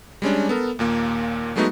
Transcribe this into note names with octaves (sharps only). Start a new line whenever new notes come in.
G3 G#3 C#4 D4
B3 A4 A#4
D#2 A#2 A#3
F#3 G#3 A3 B3 D#4 F#4